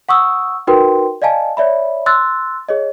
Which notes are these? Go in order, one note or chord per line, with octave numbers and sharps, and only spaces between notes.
F#5 C#6 D#6 E6
D#4 F#4 A#4 B4 G5 C6
D5 D#5 F5 G#5 A5
C#5 D5 E5 B5
C6 E6 F#6 A6
G#4 C#5 D#5